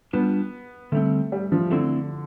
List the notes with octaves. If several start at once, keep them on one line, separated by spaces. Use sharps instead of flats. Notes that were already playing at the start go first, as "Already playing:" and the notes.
G3 B3 D4 F4
D3 G3 A3 C4
G3
F3
D3 A3 C4 E4